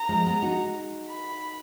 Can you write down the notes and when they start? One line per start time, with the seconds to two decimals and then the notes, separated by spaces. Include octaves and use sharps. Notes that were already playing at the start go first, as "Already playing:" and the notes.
Already playing: A#5
0.09 F3 G#3
0.26 G#3 B3
0.42 D#4 F#4
1.08 B5